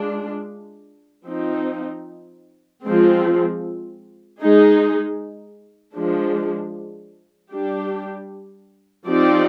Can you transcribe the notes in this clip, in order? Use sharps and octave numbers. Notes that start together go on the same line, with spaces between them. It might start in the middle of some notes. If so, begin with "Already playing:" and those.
Already playing: G#3 D4 F4
F3 C4 D#4
F3 G#3 C4
G#3 D#4 G#4
F3 G#3 D4
G3 D4 G4
F3 C4 D#4 G4 D5